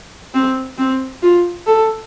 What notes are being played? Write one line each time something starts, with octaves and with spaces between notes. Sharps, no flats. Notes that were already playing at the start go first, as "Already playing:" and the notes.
C4
C4
F4
A4